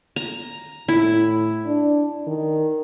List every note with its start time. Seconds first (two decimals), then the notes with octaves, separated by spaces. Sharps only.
0.16 A#5
0.88 A2 E4
1.66 D4
2.27 D#3